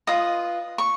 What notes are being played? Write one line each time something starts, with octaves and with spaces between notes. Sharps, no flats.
F4 B4 D#5 D#6
C#6